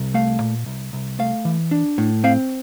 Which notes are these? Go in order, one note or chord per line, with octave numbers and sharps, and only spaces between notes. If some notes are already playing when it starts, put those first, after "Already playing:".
Already playing: C2
A3 F5
A#2
C2
C2
A3 F5
E3
D4
A2
C4 F5